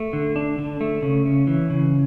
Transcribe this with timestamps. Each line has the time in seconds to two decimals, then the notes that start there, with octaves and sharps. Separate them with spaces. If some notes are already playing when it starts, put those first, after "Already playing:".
Already playing: A3
0.13 D3
0.36 D4
0.58 D3
0.81 A3
1.02 C#3
1.26 C#4
1.47 E3
1.70 C#3